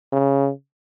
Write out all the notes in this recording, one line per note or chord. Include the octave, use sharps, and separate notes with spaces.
C#3